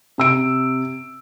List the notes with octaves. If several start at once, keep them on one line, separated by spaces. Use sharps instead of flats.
C3 E6 D7